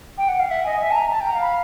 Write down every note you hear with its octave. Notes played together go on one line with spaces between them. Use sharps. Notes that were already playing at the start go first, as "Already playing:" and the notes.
G5
F#5
F5
E5 F#5
D#5 G#5
E5
A5
A#5
A5
G5
A#5
F#5
F5
B5